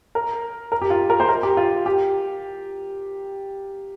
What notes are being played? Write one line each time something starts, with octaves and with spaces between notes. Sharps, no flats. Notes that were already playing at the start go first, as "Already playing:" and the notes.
A#4
A#4
G4
F4
A#4
C5
A#4
G4
F4
G4